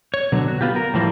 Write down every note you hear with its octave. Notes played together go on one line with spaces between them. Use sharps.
C#5
B2 D3 F#3
F#4
B3 F4 G4
A#4
A2 E3 F3 G3 A#3